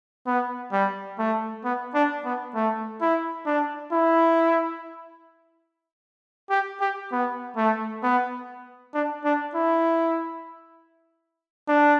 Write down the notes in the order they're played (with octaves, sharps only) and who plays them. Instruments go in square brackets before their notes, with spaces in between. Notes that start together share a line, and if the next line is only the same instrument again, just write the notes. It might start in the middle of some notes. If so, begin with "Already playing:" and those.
[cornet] B3
G3
A3
B3
D4
B3
A3
E4
D4
E4
G4
G4
B3
A3
B3
D4
D4
E4
D4